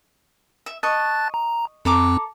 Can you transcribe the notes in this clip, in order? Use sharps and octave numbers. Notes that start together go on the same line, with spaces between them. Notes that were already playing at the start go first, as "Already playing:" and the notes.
E5
D#5 A5 C#6 F#6 A6
A#5
F2 C4 A4 A#5 D6